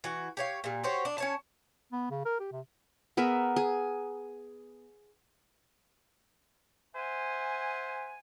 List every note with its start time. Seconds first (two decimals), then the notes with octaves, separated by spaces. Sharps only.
0.04 E3 F#4
0.37 G4 C#5 F5
0.64 A#2 G3
0.84 F#4 G4 C5 C#5
1.05 D4
1.18 C#4 C#5 A5
1.92 B3
2.11 C#3
2.25 A#4
2.40 G4
2.52 C3
3.17 B3 G#4 A#4 E5
3.56 G#4
6.96 C5 E5 F#5 G#5